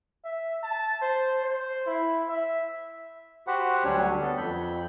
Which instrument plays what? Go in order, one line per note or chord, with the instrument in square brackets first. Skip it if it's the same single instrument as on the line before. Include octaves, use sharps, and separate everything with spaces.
[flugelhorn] E5
A5
C5
C5
E4
E5
[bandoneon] F#4 G4 C5 F#5 B5
D2 F#3 G3 C#4 D4 C#5
B3 A4
F2 B5 G6